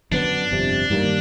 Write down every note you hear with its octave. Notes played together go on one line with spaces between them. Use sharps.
F#2 D3 F#3 B3 D4
G1 F2 C3
G2 D#3 G3 A#3